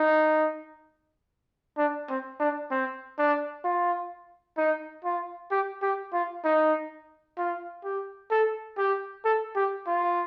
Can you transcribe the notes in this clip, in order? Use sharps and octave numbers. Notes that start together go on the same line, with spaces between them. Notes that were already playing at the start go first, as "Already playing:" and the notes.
Already playing: D#4
D4
C4
D4
C4
D4
F4
D#4
F4
G4
G4
F4
D#4
F4
G4
A4
G4
A4
G4
F4